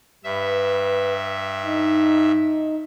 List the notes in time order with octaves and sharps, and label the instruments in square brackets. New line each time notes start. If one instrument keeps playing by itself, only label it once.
[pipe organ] G2 E5 [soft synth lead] B4
[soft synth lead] D#4